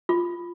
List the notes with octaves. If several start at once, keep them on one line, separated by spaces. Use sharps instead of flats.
F4